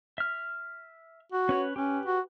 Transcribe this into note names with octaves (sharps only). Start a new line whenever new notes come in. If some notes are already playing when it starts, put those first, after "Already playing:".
E5 F6
F#4
C#4 B4 C#5
C#4 G4 B4
F#4